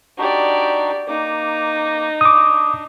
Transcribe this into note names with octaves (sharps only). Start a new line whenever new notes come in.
D4 D#4 F#4 G4 D5
A#3 D#4 D6
D4 D6 D#6